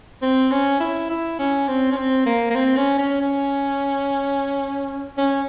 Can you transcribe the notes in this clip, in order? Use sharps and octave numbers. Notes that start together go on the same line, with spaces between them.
C4
C#4
E4
E4
C#4
C4
C#4
C4
A#3
A#3
C4
C#4
C#4
C#4
C#4